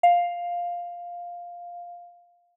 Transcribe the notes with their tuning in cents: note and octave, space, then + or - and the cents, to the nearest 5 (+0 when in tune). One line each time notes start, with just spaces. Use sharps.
F5 +5